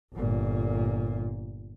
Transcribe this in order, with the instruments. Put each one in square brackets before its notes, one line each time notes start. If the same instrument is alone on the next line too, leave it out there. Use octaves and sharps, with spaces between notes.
[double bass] G1 A#2